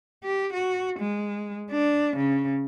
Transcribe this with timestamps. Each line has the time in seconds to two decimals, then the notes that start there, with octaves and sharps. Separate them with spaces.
0.24 G4
0.54 F#4
0.99 G#3
1.71 D4
2.17 C#3